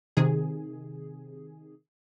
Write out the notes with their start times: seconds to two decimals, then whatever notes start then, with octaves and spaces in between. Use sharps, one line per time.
0.17 C3 D#3 G#4